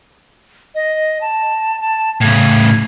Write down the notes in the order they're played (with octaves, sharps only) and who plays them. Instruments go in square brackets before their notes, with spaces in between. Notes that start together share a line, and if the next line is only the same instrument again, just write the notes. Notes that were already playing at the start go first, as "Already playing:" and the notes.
[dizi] D#5
A5
A5
[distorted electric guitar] A2 C#3 [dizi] G#6